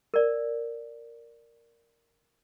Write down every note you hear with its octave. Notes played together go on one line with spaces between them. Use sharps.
A#4 D5